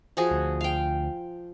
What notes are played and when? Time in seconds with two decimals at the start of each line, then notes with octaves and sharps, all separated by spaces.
0.17 F3 F#4 G#4
0.31 D2
0.61 F5 G5